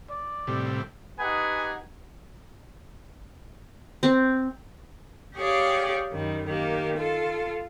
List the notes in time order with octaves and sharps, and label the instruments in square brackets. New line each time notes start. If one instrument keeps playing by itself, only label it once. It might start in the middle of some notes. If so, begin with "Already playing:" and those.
[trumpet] D5
[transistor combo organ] A2 C3 G3
[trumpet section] D#4 G4 G#4 B4 F#5 G#5
[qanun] C4
[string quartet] G4 G#4 C#5 D5 F5 G5
F#2 D#3 G3
D#3 A#3 G4
F4 A4